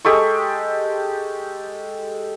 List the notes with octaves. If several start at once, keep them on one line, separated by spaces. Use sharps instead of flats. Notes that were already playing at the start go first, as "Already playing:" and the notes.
G#3 G4 A4 C#6